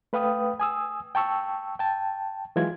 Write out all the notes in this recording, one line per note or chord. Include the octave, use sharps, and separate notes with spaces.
A3 B4 F5 G5 D#6
G#5 D#6 E6
G5 A5 C#6 E6
G5 A5
E3 F#3 G#3 F4 G#6